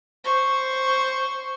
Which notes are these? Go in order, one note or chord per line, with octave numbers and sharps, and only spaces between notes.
C5 C#6